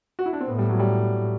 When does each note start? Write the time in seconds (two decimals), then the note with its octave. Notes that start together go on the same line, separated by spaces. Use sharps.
0.19 F#4
0.26 E4
0.33 D4
0.41 C4
0.48 A2 B3
0.58 G3
0.69 F#3
0.79 G3